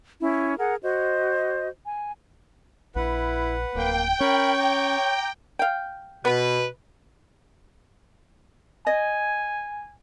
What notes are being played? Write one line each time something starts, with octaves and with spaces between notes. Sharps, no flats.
C#4 E4
G#4 A#4 F#5
F#4 C5 D#5
G#5
A#1 E4 B4 F#5
D1 A#3 G5
C#4 A#4 C#5 B5
A#5 D6
F5 G5
B2 B3 B4
D#5 G#5